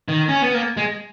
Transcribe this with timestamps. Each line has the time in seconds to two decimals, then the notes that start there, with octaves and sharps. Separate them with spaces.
0.09 D#3
0.29 C#4
0.42 B3
0.54 A#3
0.77 G#3